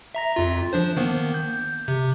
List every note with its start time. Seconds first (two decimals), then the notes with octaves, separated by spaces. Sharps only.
0.15 E5 A#5 A#6
0.36 F2 F4
0.73 F3 D4 C5
0.97 D#3 A#3 B3
1.34 G6
1.88 C3